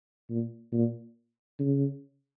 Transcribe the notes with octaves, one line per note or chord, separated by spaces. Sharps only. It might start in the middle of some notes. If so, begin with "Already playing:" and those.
A#2
A#2
C#3